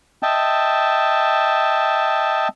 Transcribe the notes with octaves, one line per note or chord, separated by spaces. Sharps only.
D#5 E5 G5 A5